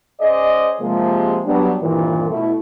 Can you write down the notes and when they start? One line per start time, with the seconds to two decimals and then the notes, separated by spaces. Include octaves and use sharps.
0.20 C#4 G#4 C5 D5 D#5
0.80 C3 F3 G#3 A#3
1.46 F#3 G3 B3 D4
1.81 C2 G2 A#2 D#3 E3
2.28 B2 A3 E4